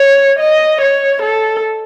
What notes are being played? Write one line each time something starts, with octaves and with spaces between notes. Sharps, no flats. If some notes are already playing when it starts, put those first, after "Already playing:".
Already playing: C#5
D#5
C#5
A4